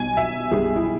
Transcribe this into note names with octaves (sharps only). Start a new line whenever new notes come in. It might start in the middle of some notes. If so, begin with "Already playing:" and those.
Already playing: B1 B2 G3 G#5
E5
B1 B2 G3 G#4
E4